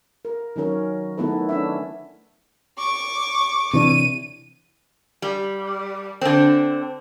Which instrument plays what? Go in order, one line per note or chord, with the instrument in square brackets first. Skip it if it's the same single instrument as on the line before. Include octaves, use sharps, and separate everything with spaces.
[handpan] A#4
D#3 F#3 C#4 A#4
D#3 A3 B3 E4 A4 B4
C#4 D4 E5
[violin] C#6 D6
[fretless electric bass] C3 E3 D4 [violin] D#7
[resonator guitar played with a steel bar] G3
D3 C4